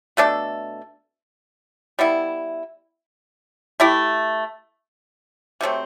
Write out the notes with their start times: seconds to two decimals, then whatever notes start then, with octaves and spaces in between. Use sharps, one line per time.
0.17 B2 A3 D4 A4
1.99 G3 B3 E4
3.80 A3 E4 G4
5.61 C3 F#3 A3 C4